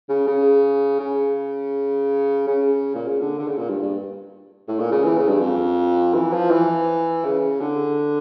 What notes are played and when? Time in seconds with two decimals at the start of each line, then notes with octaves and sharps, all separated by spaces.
0.09 C#3
0.27 C#3
1.00 C#3
2.47 C#3
2.95 A#2
3.07 C#3
3.21 D3
3.39 D3
3.48 C#3
3.58 A#2
3.69 G2
3.82 G2
4.68 A2
4.80 A#2
4.91 C#3
5.04 E3
5.17 C#3
5.28 G2
5.41 F2
6.14 E3
6.33 F3
6.51 E3
7.25 C#3
7.61 D3